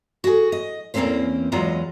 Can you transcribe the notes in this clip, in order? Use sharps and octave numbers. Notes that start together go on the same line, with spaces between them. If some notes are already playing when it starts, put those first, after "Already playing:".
F#4 G#4
D#5
E2 E3 A#3 C4 C#4 C5
E2 F#3 G#3 F4 D#5 A#5